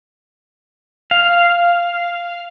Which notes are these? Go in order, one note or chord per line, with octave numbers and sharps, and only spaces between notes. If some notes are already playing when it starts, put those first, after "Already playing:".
F5